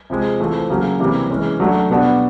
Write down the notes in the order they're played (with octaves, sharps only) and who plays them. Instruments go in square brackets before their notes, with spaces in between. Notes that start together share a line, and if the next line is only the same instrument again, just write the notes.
[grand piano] C3 F3 G#3
E3 A3 C4 F4
C#3 F#3 A#3
C3 E3 G3 A#3
E3 G#3 C#4
F#3 A3 D4 F#4
B2 G3 B3 D4 F#4